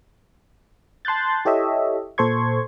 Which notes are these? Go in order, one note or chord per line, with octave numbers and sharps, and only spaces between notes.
A5 C6 F#6 G6 A6
E4 G4 A4 C#5 D#5 E5
A#2 A4 C5 C6 C#6 G#6